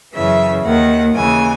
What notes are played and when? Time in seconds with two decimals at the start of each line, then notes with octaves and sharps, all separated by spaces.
0.13 F#2 C#3 E3 E5
0.64 D#2 D#3 F#5
1.15 D#2 C#3 E3 G#5